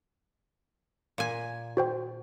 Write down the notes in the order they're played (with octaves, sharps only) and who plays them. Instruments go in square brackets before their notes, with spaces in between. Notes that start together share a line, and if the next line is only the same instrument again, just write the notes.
[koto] A#2 G#5
[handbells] F#4 C5 G5